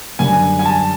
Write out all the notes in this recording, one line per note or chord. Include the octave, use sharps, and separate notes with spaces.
F#2 D3 G3 G#5
G#5
A5